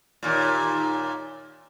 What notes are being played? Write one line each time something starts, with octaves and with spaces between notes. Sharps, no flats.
D#2 A#2